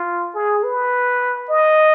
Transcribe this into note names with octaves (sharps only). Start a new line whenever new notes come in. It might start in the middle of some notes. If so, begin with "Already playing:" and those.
Already playing: F4
G#4
B4
D#5